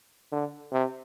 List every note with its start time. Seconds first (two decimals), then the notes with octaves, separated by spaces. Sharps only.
0.32 D3
0.72 C3